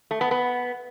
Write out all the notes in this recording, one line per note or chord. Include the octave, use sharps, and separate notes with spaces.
A3
B3
B3